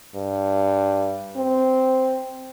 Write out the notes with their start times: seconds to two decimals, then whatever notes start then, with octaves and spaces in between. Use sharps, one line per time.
0.15 G2
1.37 C4